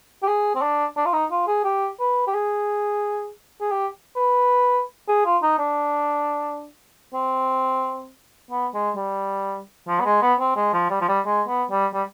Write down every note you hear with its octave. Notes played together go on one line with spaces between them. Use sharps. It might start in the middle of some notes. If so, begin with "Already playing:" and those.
G4
G#4
C4
D4
D4
F4
D#4
F4
G#4
G4
B4
G4
G#4
G#4
G4
B4
G#4
F4
D#4
D4
C4
B3
G#3
G3
F3
B3
G#3
B3
C4
G#3
F3
G3
F3
G3
G#3
B3
G3
G3